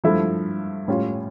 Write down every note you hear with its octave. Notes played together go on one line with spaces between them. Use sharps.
G2 F3 A3 E4
A2 G3 C#4 F4